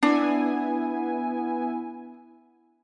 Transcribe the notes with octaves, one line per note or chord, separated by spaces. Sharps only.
B3 D4 E4 G#5